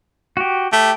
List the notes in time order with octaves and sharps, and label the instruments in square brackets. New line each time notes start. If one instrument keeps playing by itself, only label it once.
[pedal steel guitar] F#4 G4
[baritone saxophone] A3 [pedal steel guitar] G4